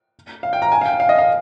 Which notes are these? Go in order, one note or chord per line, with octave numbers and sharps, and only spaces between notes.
F5
G5
A#5
G#5
F5
G5
F5
D#5
F5